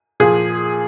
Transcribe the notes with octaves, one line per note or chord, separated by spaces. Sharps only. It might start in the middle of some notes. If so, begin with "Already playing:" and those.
A#2 F3 G#4